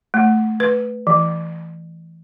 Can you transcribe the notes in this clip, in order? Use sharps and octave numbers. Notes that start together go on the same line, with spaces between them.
A3
B4
E3